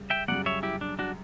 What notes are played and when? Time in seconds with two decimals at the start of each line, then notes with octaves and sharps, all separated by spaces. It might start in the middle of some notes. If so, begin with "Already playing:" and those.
Already playing: C#3 G3
0.10 E5 G5
0.28 F#2 C#3 G3 D5 F#5
0.46 C#5 E5
0.63 E4 G4
0.81 D4
0.99 D4 F#4